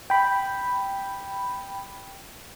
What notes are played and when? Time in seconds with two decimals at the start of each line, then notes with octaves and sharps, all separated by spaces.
0.10 G5 B5